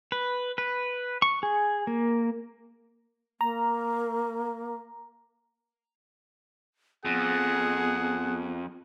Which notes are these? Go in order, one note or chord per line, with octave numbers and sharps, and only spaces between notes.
B4
B4
C#6
G#4
A#3
A#3 A#5
F2 B3 G#4 F#5